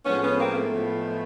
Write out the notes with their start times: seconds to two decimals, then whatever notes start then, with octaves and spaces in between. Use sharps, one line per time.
0.05 A2 F3 G#3 B3 C#4
0.22 B3 C#4
0.39 A#3 C4
0.55 A3 B3
0.71 A2 F3 G#3